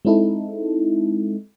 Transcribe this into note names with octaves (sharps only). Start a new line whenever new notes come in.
G#3 C4 D#4 E4 A4